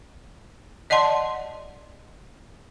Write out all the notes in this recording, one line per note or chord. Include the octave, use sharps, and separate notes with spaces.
D5 D#5 F#5 A5 C6